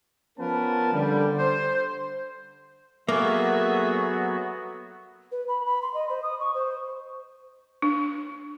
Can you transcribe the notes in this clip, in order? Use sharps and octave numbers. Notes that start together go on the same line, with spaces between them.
F3 B3 C#4 A#4 B4 A5
D3 G3
C5
F#3 A#3 B3 F#4 G#4 A4 E5
B4
B5
B5
C6
D#5
C5
D#6
C#6
C5
D4